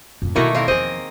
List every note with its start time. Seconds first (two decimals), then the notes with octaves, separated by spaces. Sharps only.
0.22 F2 A2
0.36 B2 D#3 E3 A3 A#3 E4 F#4 A#4
0.54 D#2 A2 C4 A#4 F5
0.68 E2 F3 G#4 C5 D#5